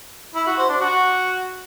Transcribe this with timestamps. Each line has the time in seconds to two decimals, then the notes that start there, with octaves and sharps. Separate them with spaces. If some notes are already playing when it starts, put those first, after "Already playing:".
0.35 E4
0.46 F#4
0.58 C5
0.69 D4
0.81 F#4